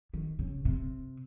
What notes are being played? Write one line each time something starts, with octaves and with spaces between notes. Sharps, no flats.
D#3
C#3
C3